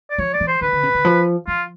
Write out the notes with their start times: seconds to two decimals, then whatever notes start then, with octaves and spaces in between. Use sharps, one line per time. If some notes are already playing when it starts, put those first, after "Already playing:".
0.10 D5
0.18 F3 C#5
0.34 D5
0.40 E3
0.48 C5
0.61 D#3 B4
0.72 D3
0.83 C#3
0.94 D3
1.05 F3
1.47 F3 F4